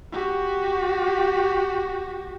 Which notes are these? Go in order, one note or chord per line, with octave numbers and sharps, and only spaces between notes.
F#4 G4